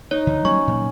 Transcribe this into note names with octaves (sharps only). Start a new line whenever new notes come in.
D#4 C#5
D2 D3
F#3 G3 A#3 C#4 C#6
A#2 F#3 A#3